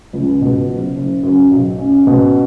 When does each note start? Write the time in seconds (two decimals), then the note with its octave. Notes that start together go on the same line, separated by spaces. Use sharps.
0.13 C#2
0.42 B2
0.69 F#1
0.96 F#1
1.23 F#2
1.51 B1
1.79 C#4
2.07 B2